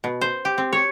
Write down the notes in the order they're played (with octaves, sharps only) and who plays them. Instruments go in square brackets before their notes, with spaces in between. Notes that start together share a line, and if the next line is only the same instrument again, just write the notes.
[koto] B2
C5
G4
C4
C#5